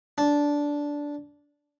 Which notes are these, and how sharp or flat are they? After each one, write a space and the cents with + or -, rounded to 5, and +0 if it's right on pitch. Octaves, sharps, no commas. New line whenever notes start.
D4 -10